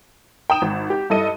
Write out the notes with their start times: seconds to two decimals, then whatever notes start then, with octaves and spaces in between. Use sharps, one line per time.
0.50 G5 A#5 D#6 E7
0.62 G#1
0.90 G4
1.10 G2 E4 A4 D#5 D#7